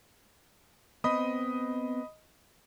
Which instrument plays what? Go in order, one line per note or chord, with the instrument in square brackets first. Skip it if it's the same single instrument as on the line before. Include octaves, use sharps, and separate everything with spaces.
[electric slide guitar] B3 C4 [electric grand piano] D#5 B5 D#6